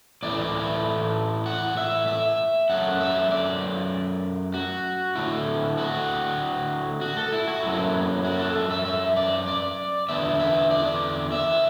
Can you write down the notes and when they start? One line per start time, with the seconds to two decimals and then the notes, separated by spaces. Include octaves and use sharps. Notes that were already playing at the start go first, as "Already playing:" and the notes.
0.23 A2 E3 A3 E4 D5
1.46 F#5
1.77 E5
2.07 E5
2.70 F#2 F#3 A3 F#5
3.00 E5
3.31 D5
4.54 F#4
5.15 D3 A3 E4
5.78 F#4
7.01 F#4
7.17 A4
7.32 E4
7.48 F#4
7.63 F#2 F#3 A3 E4
8.25 F#4
8.40 A4
8.55 E5
8.70 E5
8.85 E5
9.17 D5
9.47 D5
10.09 E2 D3 B3 D4 E5
10.40 E5
10.71 D5
11.32 E5